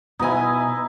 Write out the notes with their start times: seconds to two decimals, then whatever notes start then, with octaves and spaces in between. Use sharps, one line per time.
0.19 B2 D#4 E4 B4 G#5